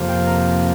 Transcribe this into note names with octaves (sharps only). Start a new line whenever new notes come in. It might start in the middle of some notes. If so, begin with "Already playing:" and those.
Already playing: F2 C3 F3 A#3
G5
A#4